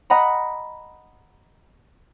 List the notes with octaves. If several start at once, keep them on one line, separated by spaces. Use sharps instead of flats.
D#5 F#5 A#5 B5